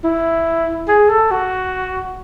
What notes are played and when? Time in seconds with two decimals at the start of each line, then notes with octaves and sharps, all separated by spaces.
0.04 E4
0.88 G#4
1.09 A4
1.31 F#4